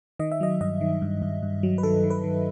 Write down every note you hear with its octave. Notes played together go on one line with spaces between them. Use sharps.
D#3 D#5
E5
F#3 D#5
G2 D#5
D#3
G2
G2
G2
F#3
B4
D#3 A4
D#3
B4
D#3